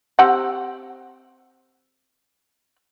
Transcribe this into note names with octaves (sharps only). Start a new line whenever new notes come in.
C4 G4 F#5